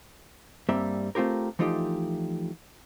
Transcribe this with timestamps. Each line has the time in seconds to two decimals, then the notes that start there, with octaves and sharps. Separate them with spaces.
0.69 G2 G3 A#3 C4 E5
1.15 A3 C4 F4 G4 A#4
1.59 E3 F3 A3 D#4 F4 G4